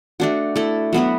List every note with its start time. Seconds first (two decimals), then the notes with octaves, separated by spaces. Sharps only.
0.20 A3 D4 F#4
0.56 A3 E4 A4
0.93 F#3 B3 F#4 B4